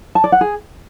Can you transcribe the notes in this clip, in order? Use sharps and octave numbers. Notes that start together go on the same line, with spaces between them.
A5
D5
F#5
G#4